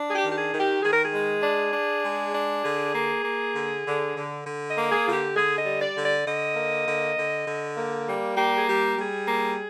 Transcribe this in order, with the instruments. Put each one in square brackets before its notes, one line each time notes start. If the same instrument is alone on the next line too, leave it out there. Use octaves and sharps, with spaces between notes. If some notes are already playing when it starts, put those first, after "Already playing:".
Already playing: [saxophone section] D4
G#4
G4
D#3
G4
G#4
D#3
G4
D#3 G#4
A#4
G#4
G#3
D4
D4
G#3
D4
D3 G#4
A#3
A#3
D3
D3
D3
D3
D#5
A#3
G#4
D3 F4
G4
D3 G#4
D#5
G3
D5
D3
D5
D3 D#5
A#3
D3
D3
D3
A#3
G3
A#3 G4
G#4
G3 G4
G3 G#4
A#3